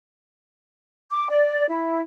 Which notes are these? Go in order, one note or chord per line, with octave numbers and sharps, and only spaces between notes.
D6
D5
E4